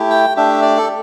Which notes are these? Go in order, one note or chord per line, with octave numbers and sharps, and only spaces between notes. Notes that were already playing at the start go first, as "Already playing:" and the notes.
Already playing: A3 E4 G4
G5
A3 D4 G4 E5
D5
A4